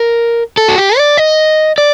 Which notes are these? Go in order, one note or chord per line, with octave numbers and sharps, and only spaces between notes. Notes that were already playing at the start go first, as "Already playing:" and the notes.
Already playing: A#4
A4
F#4
G4
D5
D#5
D5